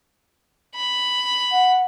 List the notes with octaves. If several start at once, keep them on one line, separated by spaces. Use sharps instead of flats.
B5
F#5